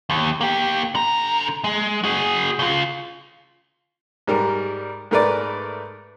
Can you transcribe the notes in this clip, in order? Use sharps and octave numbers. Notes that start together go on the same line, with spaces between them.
D#2
A#3 G4
D3 A#5
G#3
F#4 G#4
C#3 F4
G#2 G3 A#4
G#2 A3 A#4 B4 D5